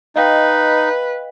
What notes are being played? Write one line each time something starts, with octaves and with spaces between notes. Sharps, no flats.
D#4 B4 D#5 F5 G5